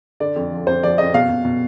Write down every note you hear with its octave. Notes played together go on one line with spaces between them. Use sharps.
D3 D5
F2
F3
F2 C5
F3 D5
F2 D#5
B2 F5
B2
B2